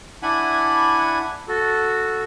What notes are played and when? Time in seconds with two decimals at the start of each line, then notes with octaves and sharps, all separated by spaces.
0.23 D4 E4 F#5 G#5 B5
1.48 F#4 A4